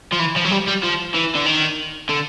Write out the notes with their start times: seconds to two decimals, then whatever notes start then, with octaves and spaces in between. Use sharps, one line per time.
0.13 F3
0.20 E3
0.36 F3
0.45 F#3
0.51 G3
0.67 G3
0.83 F3
1.15 E3
1.35 D3
1.46 D#3
2.09 D3